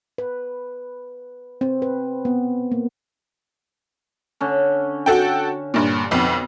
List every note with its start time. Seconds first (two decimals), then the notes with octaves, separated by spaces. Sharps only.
0.18 B4
1.61 C4
1.82 B4
2.25 B3
2.72 A#3
4.41 D3 C#4
5.06 F#4 A4 G5
5.74 G2 A#2
6.11 B1 F2 B3